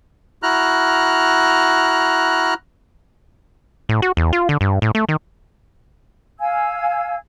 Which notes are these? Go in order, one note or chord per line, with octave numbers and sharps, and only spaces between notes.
E4 F#4 A#5 F6 F#6
A2
F#4
E2
F4
D3
G2
A2
A3
D#3
F5 G#5 E6 G#6